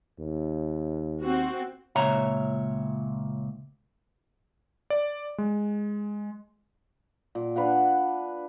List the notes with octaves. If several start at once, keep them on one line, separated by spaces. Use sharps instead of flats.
D#2
C4 F#4
C#2 A#2 C#5 E5 A#5
D5
G#3
A#2
D4 B4 F5 F#5